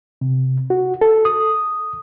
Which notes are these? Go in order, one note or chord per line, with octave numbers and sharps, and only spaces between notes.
C3
F#4
A4
D#6